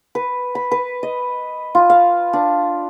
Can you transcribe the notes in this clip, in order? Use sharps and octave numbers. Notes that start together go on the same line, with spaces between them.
B4
B5
B4
D#5
F4
F5
D4